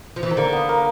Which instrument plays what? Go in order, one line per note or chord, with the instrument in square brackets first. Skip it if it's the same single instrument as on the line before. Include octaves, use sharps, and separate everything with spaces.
[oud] F3
E3
D#3
[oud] D3 [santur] A#3
[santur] B3
A#3